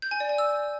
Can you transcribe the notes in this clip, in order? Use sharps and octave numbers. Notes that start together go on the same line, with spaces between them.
G6
G#5
D5
G#5
E6